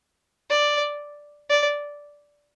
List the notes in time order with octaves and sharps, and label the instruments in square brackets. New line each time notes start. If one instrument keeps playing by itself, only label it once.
[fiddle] D5
D5